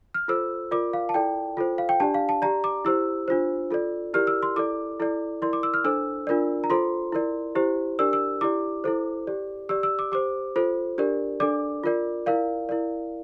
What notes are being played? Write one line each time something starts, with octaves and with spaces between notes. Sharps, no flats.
F6
F4 A4 C5 E6
F4 A#4 D5 D6
F5
A5
E4 A4 D5 G5
F4 A4 C5
F5
G5
D4 G4 D5 A5
F5
A5
G4 D5 A#5
D6
E4 G4 C5 E6
D4 F4 C5
F4 A4 D5
E4 G4 A#4 D5 F6
E6
C6
E4 A4 D5 D6
E4 A4 D5
E4 A#4 D5 C6
D6
E6
F6
D4 A4 C5 E6
D4 F4 A#4 D5
A#5
F4 A4 C5 C6
E4 A#4 D5
E4 G4 C5
D4 G4 A#4 D5 E6
E6
E4 G4 D5 D6
E4 A4 C5
G4 D5
G4 D5 E6
E6
D6
G4 C5 D6
F4 A4 C5
D4 G4 A#4 D5
D4 A4 D5 D6
F4 A#4 D5
E4 A#4 D5 F5
E4 A#4 D5